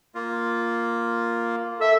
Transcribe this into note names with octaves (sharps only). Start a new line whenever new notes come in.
A#3 F4
A4 E5